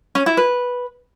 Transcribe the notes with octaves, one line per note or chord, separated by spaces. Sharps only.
C#4
E4
B4